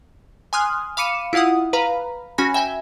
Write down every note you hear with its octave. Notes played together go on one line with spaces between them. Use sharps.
G#5 C6 D#6 F6 F#6
F5 B5 D6 C#7 D#7 E7
E4 F4 F5 F#5 D#6
B4 F5 A#5 B5
C#4 F#4 G#5 B5 A#6
E5 G5 G#5